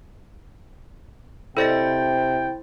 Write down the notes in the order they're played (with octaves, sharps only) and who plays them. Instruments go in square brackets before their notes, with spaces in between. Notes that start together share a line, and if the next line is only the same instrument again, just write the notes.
[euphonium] C3 [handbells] E4 C5 A6 [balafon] A4 D5 D#5 [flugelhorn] G5